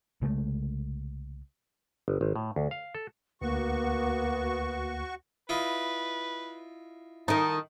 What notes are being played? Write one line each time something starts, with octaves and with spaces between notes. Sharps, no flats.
C2 C#3 G#3 A3
G1
G#1
A2
D2
F5
A4
D2 A#3 B3 F#4 C#6
E4 F4 B4 D#5
D#3 D#4 A5